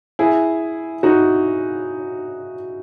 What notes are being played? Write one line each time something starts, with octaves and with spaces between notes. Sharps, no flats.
E4 G#4
D#4 F#4